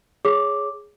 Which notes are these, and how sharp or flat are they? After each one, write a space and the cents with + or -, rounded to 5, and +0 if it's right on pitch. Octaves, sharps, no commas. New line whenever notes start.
G#4 +0 C#5 +10 D6 +0